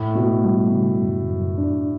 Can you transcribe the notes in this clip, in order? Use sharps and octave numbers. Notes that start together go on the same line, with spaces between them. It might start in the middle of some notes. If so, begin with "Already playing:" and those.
Already playing: A2 A3
B2 A3
B2 G3
C#3
F#2
F#2
D4